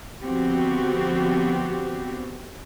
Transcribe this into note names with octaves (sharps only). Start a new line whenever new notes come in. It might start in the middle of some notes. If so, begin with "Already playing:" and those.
D3 F3 B3 C4 F#4 G4